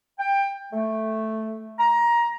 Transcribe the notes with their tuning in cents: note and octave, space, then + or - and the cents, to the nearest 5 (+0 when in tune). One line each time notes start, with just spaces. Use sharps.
G5 +20
A3 +0
A#5 +20